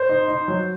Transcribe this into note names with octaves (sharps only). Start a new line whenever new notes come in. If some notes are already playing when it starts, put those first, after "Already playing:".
Already playing: C5
D#4
D#4
F#3